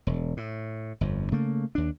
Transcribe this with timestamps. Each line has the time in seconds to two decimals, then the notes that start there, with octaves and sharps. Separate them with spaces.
0.07 E1
0.37 A2
1.01 G1 F2
1.32 C#3 A3 A#3
1.75 D#2 D4